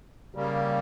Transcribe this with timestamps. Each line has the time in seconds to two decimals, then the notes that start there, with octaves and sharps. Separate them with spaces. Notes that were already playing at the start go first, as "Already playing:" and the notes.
0.35 C#3 G3 A#3